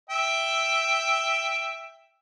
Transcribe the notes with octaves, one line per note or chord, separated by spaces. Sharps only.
E5 G5